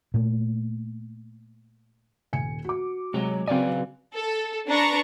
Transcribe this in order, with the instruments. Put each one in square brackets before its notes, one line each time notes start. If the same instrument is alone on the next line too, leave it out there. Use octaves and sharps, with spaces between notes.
[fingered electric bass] A#2 A3
[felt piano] D#1 G#5 C#7
F#4 D6
[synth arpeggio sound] C3 [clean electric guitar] F#3 C#5 [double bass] G#3
[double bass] C#3 F#3 [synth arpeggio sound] C4 D5 [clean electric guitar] B4 F5 G#5
[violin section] A4
D4 B4 A#5 C#6